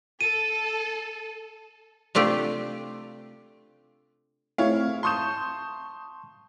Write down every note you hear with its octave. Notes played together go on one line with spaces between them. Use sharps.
A4 D#7
C3 A3 D4 F4 G4
A3 C4 E4 G#4 C#5 F5
A5 C6 C#6 D#6 G6 E7